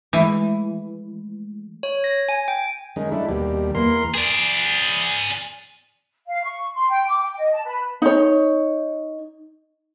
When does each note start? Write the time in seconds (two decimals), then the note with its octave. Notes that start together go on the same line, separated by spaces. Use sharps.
0.13 E3 G#3 A3
1.83 C#5
2.04 A#6
2.29 G#5
2.48 G5
2.96 D#3 G#3 C#4
3.12 G#3 A3 D4 E4
3.29 D#2 B2 G3
3.75 E2 A#3 A#4 C6
4.14 G#4 D5
6.27 F5
6.44 C#6
6.75 C6
6.90 G5
7.08 D6
7.22 G5
7.38 D#5
7.53 A5
7.65 B4
8.02 D#4 C#5